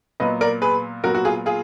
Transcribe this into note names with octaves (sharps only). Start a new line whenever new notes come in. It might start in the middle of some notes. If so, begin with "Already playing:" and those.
A#2 F#3 B3 B4 D#5
A#4 D5
G#4 B4
A#2 F#3 B3 F#4 A#4
F#4
F4 G#4
F4 G#4